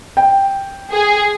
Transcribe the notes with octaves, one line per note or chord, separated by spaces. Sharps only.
G5
G#4